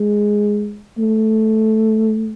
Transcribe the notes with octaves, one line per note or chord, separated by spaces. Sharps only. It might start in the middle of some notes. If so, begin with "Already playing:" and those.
Already playing: G#3
A3